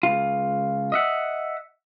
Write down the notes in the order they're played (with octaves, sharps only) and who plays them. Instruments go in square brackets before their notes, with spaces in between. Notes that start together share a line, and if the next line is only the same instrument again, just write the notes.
[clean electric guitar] C#2 F4
D#5 E5 F#5